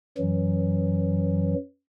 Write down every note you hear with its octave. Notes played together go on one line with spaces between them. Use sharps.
F#2 E3 F#3